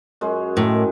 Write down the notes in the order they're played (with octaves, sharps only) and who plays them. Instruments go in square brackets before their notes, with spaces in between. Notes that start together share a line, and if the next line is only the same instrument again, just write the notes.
[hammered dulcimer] F#2 G#3
[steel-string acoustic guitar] A2 [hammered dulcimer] D#3